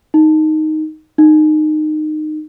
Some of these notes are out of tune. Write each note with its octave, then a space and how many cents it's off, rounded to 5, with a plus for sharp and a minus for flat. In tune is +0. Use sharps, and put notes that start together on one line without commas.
D#4 +0
D#4 -20